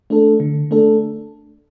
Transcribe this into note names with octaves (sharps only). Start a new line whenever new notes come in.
A3 D4 A4
D3
A3 D4 A4